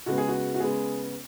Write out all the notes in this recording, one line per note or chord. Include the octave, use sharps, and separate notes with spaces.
C#3 G#3 B3 F#4
G#4
F#4
F#4
C#3 G#3 B3 G#4